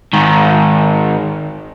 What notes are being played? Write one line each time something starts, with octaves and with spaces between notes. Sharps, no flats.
G#2 D#3